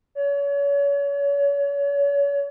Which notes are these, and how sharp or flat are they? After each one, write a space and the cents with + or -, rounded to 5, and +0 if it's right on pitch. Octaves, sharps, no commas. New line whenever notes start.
C#5 +35